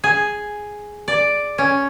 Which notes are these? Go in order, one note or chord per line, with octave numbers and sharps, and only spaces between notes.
G#4
D5
C#4